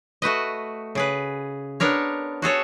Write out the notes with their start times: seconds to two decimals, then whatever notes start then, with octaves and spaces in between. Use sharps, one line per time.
0.22 A3 F#4 B4 D#5
0.95 C#3 G#4 B4
1.80 B3 D4 A#4 C#5
2.42 F#4 G#4 A4 C#5